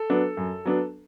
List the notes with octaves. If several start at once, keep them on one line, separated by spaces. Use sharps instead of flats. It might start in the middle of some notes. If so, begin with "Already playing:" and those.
Already playing: A4
F#3 B3 D4
F#2
F#3 B3 D4